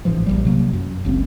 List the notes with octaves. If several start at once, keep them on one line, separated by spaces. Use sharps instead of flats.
A1 G#2 E3 F3
A#1 D#2 G3
C3 F#3 A#3
F#2
F#1 C#2 F#2 C4